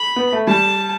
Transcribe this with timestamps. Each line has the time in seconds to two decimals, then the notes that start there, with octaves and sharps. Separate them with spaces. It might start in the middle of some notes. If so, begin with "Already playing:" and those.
Already playing: B5
0.16 B3
0.32 A3
0.47 G3 A5